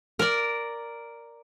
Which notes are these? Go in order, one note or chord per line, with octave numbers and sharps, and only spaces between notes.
A#4 D5